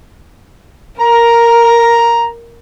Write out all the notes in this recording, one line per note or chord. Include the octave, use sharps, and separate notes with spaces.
A#4 A#5